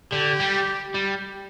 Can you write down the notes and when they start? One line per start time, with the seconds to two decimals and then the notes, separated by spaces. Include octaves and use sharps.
0.12 D3 G4
0.40 G3
0.94 G3